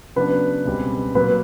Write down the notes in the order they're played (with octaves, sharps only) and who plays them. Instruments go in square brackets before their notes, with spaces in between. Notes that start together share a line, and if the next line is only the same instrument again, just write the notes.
[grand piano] C#3 F#3 B3 D4 [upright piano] B4
[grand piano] C#2 B2 G3 C4
[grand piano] A#2 F#3 A#3 [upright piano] B4